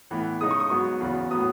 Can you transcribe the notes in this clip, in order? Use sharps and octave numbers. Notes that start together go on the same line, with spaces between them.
A2 E3 B3
C#3 G#3 D#4 D#6
C#6
D#6
G#2 F#3 B3 C#6
E2 C#3 F#3 B3
A2 F#3 B3 D#6